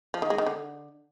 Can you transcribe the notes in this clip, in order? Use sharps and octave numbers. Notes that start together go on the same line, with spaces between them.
F3
D#3
G#3
D#3
D3